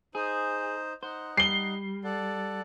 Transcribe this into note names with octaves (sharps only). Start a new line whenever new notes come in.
D#4 G#4 C5
D#4 C5 F#5
G3 C7 G7
A4 D5 F#5